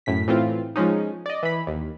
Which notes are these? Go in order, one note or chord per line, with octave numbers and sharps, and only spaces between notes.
F#2 A2 B6
A2 E3 C4 F4
F3 G#3 C#4 D#4
D5 D#5
E3 B5
D#2